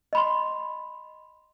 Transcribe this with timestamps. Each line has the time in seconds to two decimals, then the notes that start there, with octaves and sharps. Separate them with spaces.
0.13 D#5 B5 C6